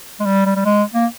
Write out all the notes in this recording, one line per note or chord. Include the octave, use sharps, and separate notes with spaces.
G#3
G3
G3
G3
G#3
A#3